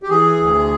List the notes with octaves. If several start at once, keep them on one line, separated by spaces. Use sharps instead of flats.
G4
E3 G#4
D2